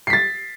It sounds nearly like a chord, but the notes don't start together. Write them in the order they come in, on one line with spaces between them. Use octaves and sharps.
C7 B6 A6